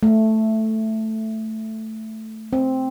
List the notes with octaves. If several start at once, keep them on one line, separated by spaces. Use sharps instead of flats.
A3
C4